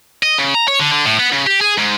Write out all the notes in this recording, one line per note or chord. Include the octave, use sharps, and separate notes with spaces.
D#5
C#3
A#5
C#5
D3
D3
A2
B3
C#3
G4
G#4
G#2